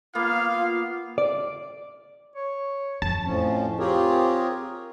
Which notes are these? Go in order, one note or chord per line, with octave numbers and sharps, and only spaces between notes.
A#3 B3 F4 F5
D5
C#5
F2 A5
F2 A2 F3 C#4
C4 F4 G4 G#4 A#4 C#5